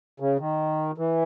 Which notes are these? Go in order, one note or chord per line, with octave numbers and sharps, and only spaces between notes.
C#3
D#3
E3